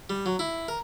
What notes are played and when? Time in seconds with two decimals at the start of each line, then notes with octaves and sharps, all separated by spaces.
0.10 G3
0.26 F#3
0.39 E4
0.68 A#4